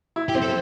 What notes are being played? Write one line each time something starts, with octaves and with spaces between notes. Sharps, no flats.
E4
G4
C4
A4